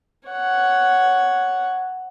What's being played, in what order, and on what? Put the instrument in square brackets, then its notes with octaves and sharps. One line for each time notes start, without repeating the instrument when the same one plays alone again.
[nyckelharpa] C#5 F#5